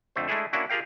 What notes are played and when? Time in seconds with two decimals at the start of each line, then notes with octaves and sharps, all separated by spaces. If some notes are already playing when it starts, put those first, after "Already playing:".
0.16 F2 D3 A3 C5
0.28 G#3 A3 D4 E4 G#4 A4
0.53 A#3 C#4 D4 E4 F#4
0.70 F4 G4 G#4 A#4 F5 G5